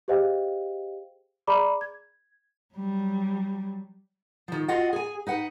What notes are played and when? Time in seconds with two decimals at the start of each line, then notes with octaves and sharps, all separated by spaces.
0.08 G4 G#4 C5 D#5 F5 G5
1.47 G#4 D5 A#5 B5 D6
1.81 G#6
2.75 F#3 G3
4.48 D#3 F3
4.68 F4 F#4 D#5 F#5
4.93 G#4 G#5
5.27 D#4 B4 F#5